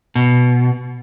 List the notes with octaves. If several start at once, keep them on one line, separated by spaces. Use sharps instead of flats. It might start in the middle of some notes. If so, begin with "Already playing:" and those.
B2